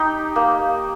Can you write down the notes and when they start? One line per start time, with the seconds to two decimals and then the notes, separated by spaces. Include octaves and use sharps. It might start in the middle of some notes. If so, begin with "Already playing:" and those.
Already playing: D#4 G4
0.36 A#3